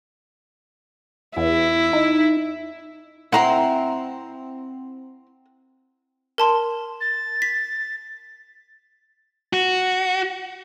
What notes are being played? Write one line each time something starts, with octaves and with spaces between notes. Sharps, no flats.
E2 E4
D#4
C4 E4 F#5 A#5 C6
A#4 A5 C6
A6
B6
F#4